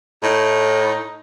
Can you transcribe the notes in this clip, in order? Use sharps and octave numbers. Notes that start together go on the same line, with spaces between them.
A2 D#4